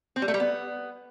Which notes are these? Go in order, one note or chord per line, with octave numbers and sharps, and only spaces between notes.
C4
G3
A3
G3
B3